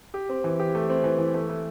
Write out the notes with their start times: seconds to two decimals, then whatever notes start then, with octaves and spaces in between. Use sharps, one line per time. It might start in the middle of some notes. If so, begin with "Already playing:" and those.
0.14 G4
0.29 C4
0.44 E3
0.59 G4
0.75 A3
0.90 C4
1.04 E3
1.19 E3
1.34 A3
1.50 A3